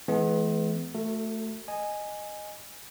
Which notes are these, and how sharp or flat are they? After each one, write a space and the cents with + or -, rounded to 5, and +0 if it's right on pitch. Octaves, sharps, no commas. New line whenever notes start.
E3 +0 G#3 +45 B3 +15
A3 +0 F#4 +0 A4 +35
D#5 -10 G#5 +0